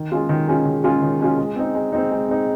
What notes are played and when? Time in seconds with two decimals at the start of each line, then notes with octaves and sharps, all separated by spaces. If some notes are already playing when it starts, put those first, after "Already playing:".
Already playing: D#3
0.12 G#3 C#4 F4
0.29 D#3
0.48 G#3 C#4 F4
0.65 D#3
0.84 G#3 C#4 F4
1.02 D#3
1.21 G#3 C#4 F4
1.38 G#3
1.56 C4 D#4
1.75 G#3
1.92 C4 D#4
2.11 G#3
2.28 C4 D#4